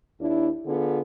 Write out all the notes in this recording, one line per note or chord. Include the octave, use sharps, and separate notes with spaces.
D#2 D4 E4
D3 B3 F4 G#4